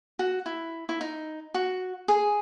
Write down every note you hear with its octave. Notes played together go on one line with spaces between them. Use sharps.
F#4
E4
E4
D#4
F#4
G#4